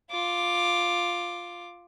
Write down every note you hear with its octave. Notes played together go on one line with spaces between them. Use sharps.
F4 D6